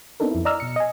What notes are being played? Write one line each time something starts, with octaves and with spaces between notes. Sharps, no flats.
B3 C4 D4 D#4 A4 A#4
F2 E4
D5 D#5 A#5 E6 F6
B2 C#7
D#5 G#5